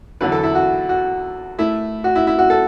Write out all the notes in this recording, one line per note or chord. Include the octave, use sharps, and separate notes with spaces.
E2 D3 F#3 B4
A4
E4
F#4
F#4
A2 A3 E4
F#4
E4
E4
F#4
A4